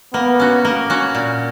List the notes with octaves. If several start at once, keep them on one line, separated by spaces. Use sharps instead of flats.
A#3 B3
C#4 F#4
A#3
C#4 F#4
A#2